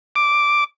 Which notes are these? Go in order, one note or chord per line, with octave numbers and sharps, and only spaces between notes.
D6